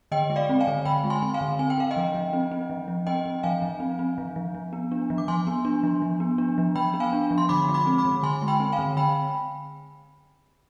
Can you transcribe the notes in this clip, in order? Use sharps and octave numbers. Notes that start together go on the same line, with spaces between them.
D3 D#5 G5
G#3
D5 F5
C4
F5 G#5
D3
D3 G5 B5
G#3
G#5 C6
C4
F5 G#5
D3
C4 G#5
G5
C4 F5
D#5 G5
F3
F3
C4
C4
F3
F3
C4 D#5 G5
C4
F3 F5 G#5
F3
C4
C4
F3
F3
F3
B3
D4
F3
D6
F3 G#5 C6
B3
D4
F3
F3
B3
D4
F3
F3 G5 B5
B3
F5 G#5
D4
F3
C6
D3 B5 D6
G#3
B5 D6
C4
B5 D6
D3
D3 G#5 C6
G#3
G5 B5
C4
F5 G#5
D3
D3 G5 B5